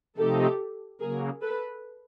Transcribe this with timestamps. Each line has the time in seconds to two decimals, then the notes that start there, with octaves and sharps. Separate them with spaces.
0.17 C3 F3 A3 C4 D#4 G4 A4
1.00 C#3 F#3 A#3 G#4 A#4
1.41 A4 B4